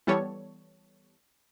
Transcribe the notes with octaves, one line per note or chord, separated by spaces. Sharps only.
E3 G3 B3 A4 C#5